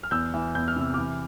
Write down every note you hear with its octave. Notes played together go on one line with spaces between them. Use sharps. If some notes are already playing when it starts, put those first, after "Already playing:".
F6
E2 E6 G6
E3
E2 G6
F6
C3 E6
E3 D6 F6